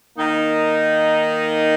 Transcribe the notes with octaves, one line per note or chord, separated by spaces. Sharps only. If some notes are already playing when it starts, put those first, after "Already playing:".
D#3 A#3 D#4